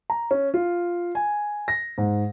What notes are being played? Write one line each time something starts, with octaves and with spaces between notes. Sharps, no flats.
A#5
C#4
F4
G#5
A#6
G#2